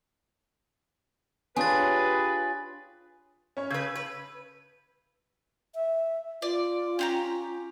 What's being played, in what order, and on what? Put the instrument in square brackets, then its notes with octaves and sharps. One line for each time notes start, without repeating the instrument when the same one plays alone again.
[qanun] D4 [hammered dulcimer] F4 C#5 [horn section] G4 G#4 B4 [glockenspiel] G#5 A6
[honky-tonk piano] C#4 C#5
[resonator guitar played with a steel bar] C#3 B4 [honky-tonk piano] E6 G6 G#6
[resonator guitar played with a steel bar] B4
[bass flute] E5
[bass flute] F4 [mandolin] D5
[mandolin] C#4 G4 A#5